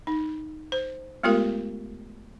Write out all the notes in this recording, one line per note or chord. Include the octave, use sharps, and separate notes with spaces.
D#4
C5
G#3 A3 B3 F4 G4 A#4